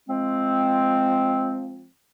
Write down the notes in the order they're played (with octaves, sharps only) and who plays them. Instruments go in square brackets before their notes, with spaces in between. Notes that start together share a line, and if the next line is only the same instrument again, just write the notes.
[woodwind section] F3 G#3 C4